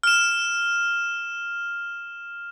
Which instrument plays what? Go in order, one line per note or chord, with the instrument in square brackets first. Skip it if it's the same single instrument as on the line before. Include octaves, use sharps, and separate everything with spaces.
[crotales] F6 E7